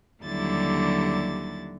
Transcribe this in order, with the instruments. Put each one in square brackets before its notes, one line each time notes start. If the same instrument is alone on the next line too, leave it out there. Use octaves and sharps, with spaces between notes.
[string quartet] D#2 D3 F#3 G3 E4 A6